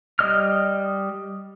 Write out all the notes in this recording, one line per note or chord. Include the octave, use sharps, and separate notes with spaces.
G3 D#5 F6